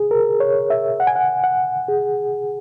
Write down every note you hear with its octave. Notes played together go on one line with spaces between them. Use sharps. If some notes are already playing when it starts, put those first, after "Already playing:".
Already playing: G#4
A#4
C#5
E5
F#5
G#5
F#5
F#5
G#4